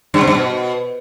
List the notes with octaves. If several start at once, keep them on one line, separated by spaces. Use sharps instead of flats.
G2
C3
G2
B2